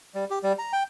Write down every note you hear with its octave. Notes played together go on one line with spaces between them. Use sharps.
G3
G4
G3
A#5
G5